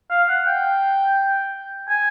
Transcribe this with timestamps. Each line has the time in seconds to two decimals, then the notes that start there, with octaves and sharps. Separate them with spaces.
0.11 F5
0.29 F#5
0.46 G5
1.89 G#5